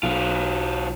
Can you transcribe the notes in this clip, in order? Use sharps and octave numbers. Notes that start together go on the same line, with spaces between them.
B1 F#3 F4